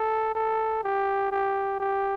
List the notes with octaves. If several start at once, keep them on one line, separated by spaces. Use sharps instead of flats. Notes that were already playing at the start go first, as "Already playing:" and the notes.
Already playing: A4
A4
G4
G4
G4